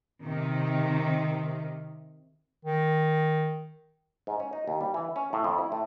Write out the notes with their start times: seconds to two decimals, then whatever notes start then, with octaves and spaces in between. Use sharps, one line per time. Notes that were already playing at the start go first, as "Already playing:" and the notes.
0.23 C3 D#3
2.65 D#3
4.27 G#2
4.40 C#4
4.53 D#4
4.68 D#2
4.81 G3
4.94 E3
5.16 C#4
5.33 A2
5.44 F2
5.58 E4
5.72 A2